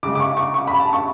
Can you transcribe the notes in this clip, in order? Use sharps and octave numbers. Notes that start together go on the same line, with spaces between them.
C#3 G#3 D6
D6
C#6
C#6
C#6
B5
A5
C#6